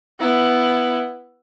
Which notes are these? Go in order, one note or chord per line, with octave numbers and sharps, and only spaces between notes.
B3 E4